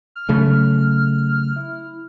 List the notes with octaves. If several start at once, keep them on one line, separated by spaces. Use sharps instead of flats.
F6
C#3 F#3 A3
E4